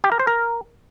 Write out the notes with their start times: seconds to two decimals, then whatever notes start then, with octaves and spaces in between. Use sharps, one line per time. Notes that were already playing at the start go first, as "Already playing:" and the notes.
0.04 G4
0.12 A#4
0.19 C5
0.27 A#4